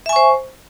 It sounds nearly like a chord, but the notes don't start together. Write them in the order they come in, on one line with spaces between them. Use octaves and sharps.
E5 G#5 C#6 C5